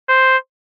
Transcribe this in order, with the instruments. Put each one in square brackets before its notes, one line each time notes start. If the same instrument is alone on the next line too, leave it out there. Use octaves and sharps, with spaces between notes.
[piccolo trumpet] C5